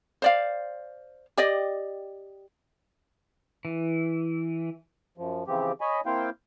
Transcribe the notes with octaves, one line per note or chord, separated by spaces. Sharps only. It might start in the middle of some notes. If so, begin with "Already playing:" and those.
C5 D5 F5
G4 D5 D#5
E3
F#2 F3
C#3 E3 F3 C4 G4
C#5 D#5 G#5 B5
A#3 C4 E4 C5 F5 G5